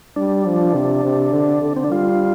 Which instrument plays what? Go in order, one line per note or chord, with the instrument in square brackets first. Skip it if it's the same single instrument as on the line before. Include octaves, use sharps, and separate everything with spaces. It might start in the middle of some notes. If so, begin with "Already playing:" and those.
[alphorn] G3 [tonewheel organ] D4
[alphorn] F3
C3
C3
D3
D3
[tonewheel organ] C4
D4
[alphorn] G3 [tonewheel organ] F4